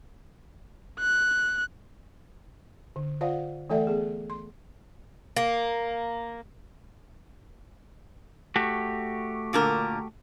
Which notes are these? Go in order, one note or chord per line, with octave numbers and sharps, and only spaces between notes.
F#6
D3
F4 C5 D5 F5 F#5
E3 A3 A4 D5 E5 F#5
B3 G#4
C6
A#3
A3 F#4 G4
A#2 D3 A#4